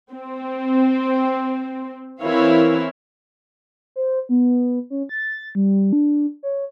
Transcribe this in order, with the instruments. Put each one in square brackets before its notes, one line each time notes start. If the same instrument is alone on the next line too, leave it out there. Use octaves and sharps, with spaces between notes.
[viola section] C4
E3 C4 E4 A#4 C#5 F5
[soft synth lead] C5
B3
C#4
A6
G3
D4
C#5